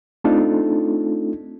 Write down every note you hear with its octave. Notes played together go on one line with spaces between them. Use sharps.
A3 C4 D4 D#4 F4 A4